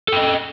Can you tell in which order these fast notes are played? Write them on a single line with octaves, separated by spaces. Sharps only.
A4 G5 D#5